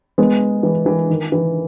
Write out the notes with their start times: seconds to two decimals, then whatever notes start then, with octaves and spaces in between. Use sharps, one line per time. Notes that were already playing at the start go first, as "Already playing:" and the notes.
0.18 G#3 B3
0.63 E3 G#3
0.86 E3
1.09 D#3
1.32 E3